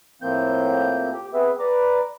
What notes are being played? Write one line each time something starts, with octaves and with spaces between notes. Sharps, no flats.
A2 F3 A#3 C4 G6
G4
B3 C4 G#4 B4 E5
B4 D5 A#5 D6